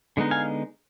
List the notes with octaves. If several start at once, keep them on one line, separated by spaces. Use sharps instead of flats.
D3 G#3 B3 D#4
F5 G#5